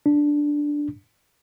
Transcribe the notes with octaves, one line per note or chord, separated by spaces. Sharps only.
D4